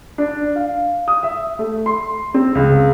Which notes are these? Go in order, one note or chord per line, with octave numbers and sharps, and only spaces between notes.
D4
F5
D#6
E5
A3
C6
C4
C#2